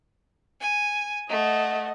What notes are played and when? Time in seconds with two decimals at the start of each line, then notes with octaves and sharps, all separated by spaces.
0.60 G#5
1.30 A3 D#5 F#5